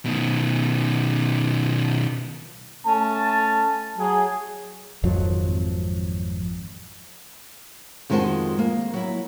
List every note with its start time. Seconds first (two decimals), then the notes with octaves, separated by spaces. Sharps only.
0.05 B2 D#3
2.86 A3 C#4 A5
3.98 F#3 G#4
5.03 G#1 F2 F3 F#3
8.10 F2 D#3 G#3 F#4 C5 A5
8.59 A#3
8.94 F#3 E4